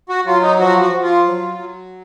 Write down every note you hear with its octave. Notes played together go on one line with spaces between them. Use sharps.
F#4
F#3 F4
D#4
F3 F#4
F#4
F3
F4
F#3
F#3